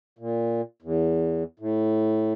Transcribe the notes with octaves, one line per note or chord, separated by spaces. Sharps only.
A#2
E2
A2